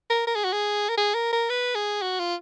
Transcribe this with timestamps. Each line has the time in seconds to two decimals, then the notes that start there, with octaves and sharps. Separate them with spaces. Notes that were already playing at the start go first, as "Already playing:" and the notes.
0.10 A#4
0.28 A#4
0.36 G#4
0.44 F#4
0.53 G#4
0.89 A#4
0.98 G#4
1.14 A#4
1.33 A#4
1.50 B4
1.75 G#4
2.02 F#4
2.19 F4